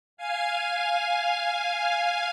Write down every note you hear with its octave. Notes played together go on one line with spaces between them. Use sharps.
F5 G#5